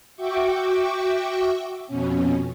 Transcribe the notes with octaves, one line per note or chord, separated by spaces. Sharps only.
F#4 E5 G5 C#6 D6
F2 B2 C#4